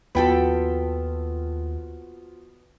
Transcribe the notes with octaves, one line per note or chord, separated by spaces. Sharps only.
D#2 F3 B3 F4 F#4 A4 G5 B5